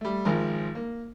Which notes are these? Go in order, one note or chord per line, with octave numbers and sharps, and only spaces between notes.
G3 A3
G#1 F3 G#3 A#4
A#3